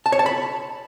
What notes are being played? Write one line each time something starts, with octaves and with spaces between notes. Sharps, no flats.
A5
C#5
A5
B5